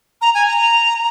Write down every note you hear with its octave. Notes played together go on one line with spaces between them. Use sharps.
A#5
G#5
A#5